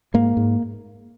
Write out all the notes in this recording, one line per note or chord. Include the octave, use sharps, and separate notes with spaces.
G#2 A#3
G#2